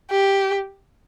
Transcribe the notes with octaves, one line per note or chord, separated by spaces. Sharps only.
G4